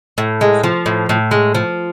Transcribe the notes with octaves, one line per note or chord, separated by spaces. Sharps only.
A2
G#3
F3
A2
A2
G#3
F3